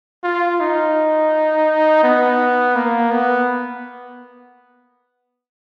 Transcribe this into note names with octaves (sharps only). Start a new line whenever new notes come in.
F4
D#4
B3
A#3
B3